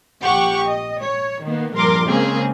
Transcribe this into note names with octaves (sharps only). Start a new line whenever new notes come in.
A#1 G4 F#5 C#6
D#5
C#5
D#3 A#3 B3
A#1 G2 A#4 C6 D6
C#3 G#3 A#3 C4 G#4